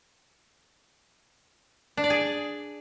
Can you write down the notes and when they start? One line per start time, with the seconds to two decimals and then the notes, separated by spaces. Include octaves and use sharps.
1.97 D4
2.04 D5
2.10 G#4